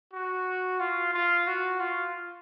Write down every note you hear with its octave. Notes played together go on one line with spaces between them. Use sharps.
F#4
F4
F4
F#4
F4